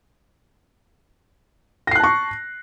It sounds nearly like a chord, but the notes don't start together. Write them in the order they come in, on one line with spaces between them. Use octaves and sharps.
A#6 C7 F#6 A5 C#6